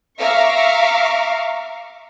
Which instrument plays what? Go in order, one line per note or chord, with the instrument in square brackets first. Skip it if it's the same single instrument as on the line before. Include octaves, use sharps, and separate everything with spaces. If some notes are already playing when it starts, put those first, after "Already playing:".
[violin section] E5 F5 A#5 C#6 D6